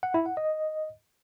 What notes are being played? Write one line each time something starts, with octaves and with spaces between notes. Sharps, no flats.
F#5
E4
F#5
D#5